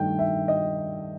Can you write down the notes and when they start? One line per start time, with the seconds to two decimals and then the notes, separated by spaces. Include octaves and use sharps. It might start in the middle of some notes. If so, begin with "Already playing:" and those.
Already playing: G2 D#3 A3 G5
0.19 E5
0.48 D#5